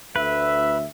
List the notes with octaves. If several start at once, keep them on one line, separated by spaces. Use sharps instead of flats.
D2 B4 E5